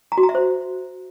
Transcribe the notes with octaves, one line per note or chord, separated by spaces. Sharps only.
A#5
F#4
A#5
E5
C5